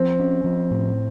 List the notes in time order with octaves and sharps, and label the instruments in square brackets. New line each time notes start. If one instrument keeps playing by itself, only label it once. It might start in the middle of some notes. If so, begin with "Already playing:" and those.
Already playing: [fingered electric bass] F3 [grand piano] C4
[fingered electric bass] C#4
F3
A2